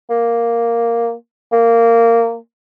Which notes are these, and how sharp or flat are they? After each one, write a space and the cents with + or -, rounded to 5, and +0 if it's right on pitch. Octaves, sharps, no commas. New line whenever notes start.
A#3 +0
A#3 -15